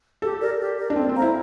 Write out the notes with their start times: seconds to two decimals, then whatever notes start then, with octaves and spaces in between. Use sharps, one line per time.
0.22 G4 A4
0.40 A#4 D5
0.60 G4
0.78 A#4 D5
0.90 D4
0.96 C4 A4
1.09 C4
1.15 C5 F5 A#5
1.22 E4